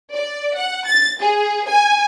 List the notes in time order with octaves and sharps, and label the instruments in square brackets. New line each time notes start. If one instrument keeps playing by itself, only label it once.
[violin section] D5
F#5
A6
G#4
G#5